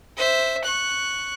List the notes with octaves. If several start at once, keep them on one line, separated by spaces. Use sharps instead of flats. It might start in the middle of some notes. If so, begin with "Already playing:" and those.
C5 E5
C#6 F#6